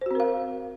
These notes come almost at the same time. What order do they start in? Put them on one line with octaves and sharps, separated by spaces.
C5 F#4 C4 A#4 F5